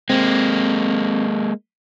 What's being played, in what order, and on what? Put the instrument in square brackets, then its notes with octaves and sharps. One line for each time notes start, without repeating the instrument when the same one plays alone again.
[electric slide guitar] G#3 A#3 [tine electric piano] C4